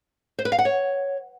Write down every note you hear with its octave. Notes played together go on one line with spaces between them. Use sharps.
C5
B4
F5
F#5
C#5